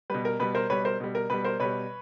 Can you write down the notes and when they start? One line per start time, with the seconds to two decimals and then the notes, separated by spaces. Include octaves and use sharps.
0.10 B2 G3 B4
0.25 A#4
0.39 B2 G3 B4
0.55 A#4 C5
0.70 B2 G3 B4 C#5
0.85 A#4 C5
1.00 B2 G3
1.15 A#4
1.30 B2 G3 B4
1.44 A#4 C5
1.60 B2 G3 B4 C#5